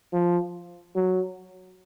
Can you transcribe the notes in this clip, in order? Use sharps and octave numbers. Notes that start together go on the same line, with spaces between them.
F3
F#3